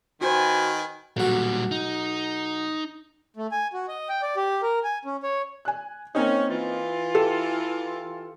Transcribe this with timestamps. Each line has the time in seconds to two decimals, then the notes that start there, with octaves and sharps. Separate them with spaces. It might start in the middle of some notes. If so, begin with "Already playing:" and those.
0.21 D#3 F#4 B4 C5 G#5
1.17 B1 A#2 G3 F#4
1.71 D#4
3.36 A3
3.52 G#5
3.73 F#4
3.88 D#5
4.09 G5
4.22 D5
4.37 G4
4.62 A#4
4.84 G#5
5.05 C#4
5.23 C#5
5.65 G#5 F#6
6.15 A#3 C4 C#4 D#4
6.49 E3 F4
7.15 G4 A4